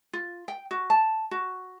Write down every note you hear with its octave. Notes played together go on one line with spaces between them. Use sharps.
F4
G5
F#4
A5
F#4